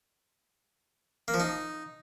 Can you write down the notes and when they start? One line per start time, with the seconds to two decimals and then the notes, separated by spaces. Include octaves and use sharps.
1.28 A#3
1.34 F3
1.40 D#4